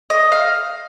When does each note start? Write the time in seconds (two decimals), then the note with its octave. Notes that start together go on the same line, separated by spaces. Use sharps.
0.10 D#5
0.32 F5